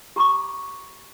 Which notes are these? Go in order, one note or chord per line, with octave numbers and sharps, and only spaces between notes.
G4 A#5 B5 C#6 D6